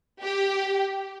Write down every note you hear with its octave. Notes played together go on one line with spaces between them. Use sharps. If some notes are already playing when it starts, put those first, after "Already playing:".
G4